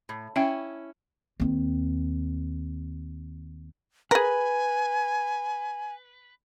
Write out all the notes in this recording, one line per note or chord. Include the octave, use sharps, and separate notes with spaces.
A2
C#4 E4 E5 G5
D#2 C4
G#4 A#4 B4 G#5